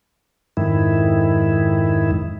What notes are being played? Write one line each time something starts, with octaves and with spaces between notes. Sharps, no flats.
F2 G#2 D#3 E4